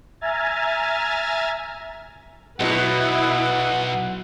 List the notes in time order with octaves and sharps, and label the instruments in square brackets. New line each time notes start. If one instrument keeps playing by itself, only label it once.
[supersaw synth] E5 G#5 A#5 F6 G#6 A6
[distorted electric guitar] B1 [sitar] B2 [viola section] E4 B4 [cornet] F#5